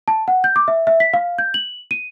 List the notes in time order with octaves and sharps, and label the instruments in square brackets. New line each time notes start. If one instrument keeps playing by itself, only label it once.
[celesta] A5
F#5
G6
D6
E5
E5
B6
F5
G6
F#7
D#7